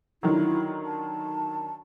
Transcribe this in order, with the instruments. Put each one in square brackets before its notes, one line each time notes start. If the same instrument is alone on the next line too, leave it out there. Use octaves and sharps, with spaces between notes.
[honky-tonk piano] D3 D#3 F#3 [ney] E4
[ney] A5